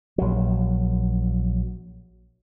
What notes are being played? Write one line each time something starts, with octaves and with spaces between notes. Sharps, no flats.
A#1 F#3